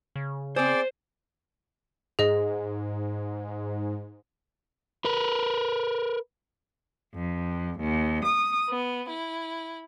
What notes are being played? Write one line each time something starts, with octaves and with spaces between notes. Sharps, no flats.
C#3
C4 G#4 C5 D5
G#2 G#4 D#5
A#4 B4
F2
D#2
D#6
B3
E4